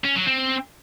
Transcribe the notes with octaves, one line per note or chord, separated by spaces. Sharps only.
C#4
F#3
C4